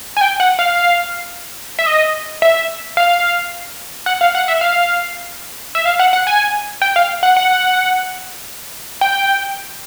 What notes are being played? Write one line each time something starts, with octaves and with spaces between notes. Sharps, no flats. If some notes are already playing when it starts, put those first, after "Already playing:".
G#5
G5
F#5
F5
E5
D#5
E5
F5
F#5
F5
F#5
E5
F5
E5
F5
F#5
F#5
G#5
G5
F5
F#5
F#5
G5